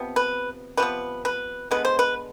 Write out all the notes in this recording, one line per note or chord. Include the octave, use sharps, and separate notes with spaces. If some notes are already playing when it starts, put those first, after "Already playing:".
Already playing: C3 F3 B3
B4
C3 F3 B3 B4
B4
D3 G#3 B3 B4
C5
B4